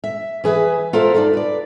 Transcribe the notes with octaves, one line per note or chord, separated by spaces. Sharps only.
E5
E3 G#4 B4 E5
F4 A4 A#4 C5 E5
D#4 F4 A4 D5
B4 D5